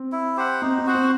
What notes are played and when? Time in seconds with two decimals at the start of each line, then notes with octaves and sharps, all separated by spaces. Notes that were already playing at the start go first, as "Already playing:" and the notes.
Already playing: C4
0.12 E4
0.37 G4 C5 F#5
0.61 C4 D#4
0.78 C4
0.86 F#4 C5 F#5
0.95 C4